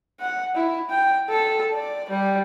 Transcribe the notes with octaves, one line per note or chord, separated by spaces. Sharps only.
F#5
E4
G5
A4
D5
G3